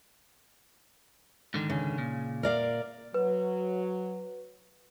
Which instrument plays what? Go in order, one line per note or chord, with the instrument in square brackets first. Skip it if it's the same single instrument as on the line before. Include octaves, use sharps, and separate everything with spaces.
[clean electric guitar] G#2 D3 D#3
[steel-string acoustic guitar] C#3
[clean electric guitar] A#2
[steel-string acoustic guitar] A#4 D5 F5
[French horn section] F#3 [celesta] B4